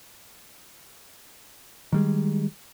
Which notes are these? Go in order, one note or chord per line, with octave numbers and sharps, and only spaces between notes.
D#3 G3 G#3